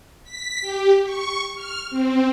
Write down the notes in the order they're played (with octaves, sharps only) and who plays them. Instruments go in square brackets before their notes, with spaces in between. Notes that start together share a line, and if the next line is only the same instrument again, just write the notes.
[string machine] B6
G4
C#6
F6
C4